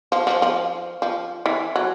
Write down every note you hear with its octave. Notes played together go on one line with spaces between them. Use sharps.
F3
F3
F3
F3
E3
F#3